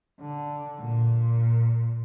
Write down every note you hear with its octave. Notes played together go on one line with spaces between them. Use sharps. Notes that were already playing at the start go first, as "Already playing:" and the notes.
D3
A#2